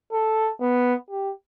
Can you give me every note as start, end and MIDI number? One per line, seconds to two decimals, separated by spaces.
0.12 0.51 69
0.60 0.94 59
1.10 1.31 67